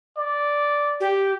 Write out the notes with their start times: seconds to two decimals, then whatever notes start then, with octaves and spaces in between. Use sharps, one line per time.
0.18 D5
1.00 G4